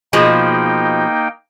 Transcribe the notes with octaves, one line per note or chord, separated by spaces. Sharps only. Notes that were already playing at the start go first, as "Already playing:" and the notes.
B2 F3 G#3 A#3 D#4 G5